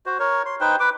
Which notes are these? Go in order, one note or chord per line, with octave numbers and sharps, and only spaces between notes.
F#4 C5
A#4 C#5
C6
D#4 B4 C5 G5
B4 D6